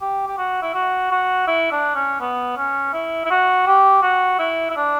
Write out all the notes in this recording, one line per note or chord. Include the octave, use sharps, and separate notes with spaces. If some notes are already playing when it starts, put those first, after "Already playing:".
G4
G4
F#4
E4
F#4
F#4
E4
D4
C#4
B3
C#4
E4
E4
F#4
G4
F#4
E4
E4
D4